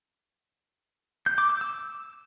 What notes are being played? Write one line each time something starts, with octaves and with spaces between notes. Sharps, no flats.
G6
D6
E6
E6